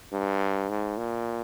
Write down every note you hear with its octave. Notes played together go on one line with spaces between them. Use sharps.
G2
G#2
A#2